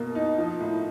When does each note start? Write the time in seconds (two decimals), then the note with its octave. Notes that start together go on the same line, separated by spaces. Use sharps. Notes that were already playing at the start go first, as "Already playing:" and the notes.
Already playing: B2 A#3
0.15 D#4
0.38 F3
0.60 A2